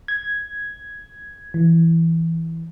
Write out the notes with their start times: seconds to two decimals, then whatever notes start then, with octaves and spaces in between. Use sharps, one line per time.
0.08 G#6
1.54 E3